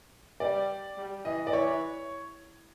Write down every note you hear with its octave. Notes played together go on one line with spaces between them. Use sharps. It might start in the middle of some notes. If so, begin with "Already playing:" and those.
G3 D5
G3
E3 D#5
D5
E3 C#5